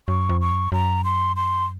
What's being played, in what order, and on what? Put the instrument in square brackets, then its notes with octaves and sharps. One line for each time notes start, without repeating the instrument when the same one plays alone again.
[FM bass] F#2 [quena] C#6
[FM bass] F2
[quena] C#6
[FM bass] F#2
[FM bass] F#2 [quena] A#5
[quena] C6
C6